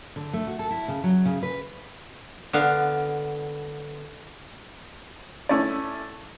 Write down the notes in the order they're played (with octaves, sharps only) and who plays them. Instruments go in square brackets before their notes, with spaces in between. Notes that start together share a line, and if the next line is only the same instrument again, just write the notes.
[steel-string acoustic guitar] D3
A3
F#4
A4
E4
C#3
F#3
C#3
B4
[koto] D3 B3 F5
[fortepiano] A3 C#4 E4 D5